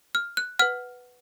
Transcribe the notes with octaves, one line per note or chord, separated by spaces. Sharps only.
F6
F#6
B4 F#5 F6